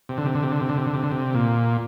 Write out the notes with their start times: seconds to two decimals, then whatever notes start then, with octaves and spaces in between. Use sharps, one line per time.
0.09 C3
0.18 D3
0.26 C3
0.35 D3
0.43 C3
0.52 D3
0.61 C3
0.69 D3
0.78 C3
0.87 D3
0.94 C3
1.03 D3
1.12 C3
1.34 A#2